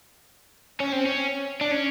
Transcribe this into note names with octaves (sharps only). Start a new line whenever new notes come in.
C#4
C4
C#4
D4
C#4